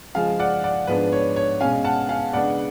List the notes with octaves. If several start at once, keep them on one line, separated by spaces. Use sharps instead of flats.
C#3 F3 G#3 F5 G#5
D5 F#5
D5 F#5
G#2 F3 B3 D4 B4
C#5
C#5
B2 G#3 C#4 F5 G#5
F#5 A5
F5 G#5
C#3 G#3 B3 D4 D5 F#5